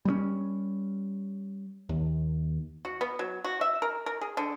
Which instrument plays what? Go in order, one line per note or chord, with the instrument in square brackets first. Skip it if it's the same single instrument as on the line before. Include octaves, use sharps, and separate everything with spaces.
[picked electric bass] G3 G#3 C#4
D#2
[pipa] F#4
B3
F#3
F#4
E5
A#4
A#4
G#4
D3